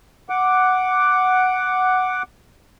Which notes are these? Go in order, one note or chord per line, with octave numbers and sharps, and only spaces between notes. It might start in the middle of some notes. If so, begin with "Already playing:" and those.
F#5 D6